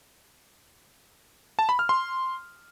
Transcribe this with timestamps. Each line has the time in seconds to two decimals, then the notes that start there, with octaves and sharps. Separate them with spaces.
1.59 A5
1.69 B5
1.79 F6
1.89 C6